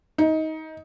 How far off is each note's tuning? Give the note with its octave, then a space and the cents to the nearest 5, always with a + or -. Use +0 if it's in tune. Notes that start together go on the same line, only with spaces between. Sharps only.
D#4 +20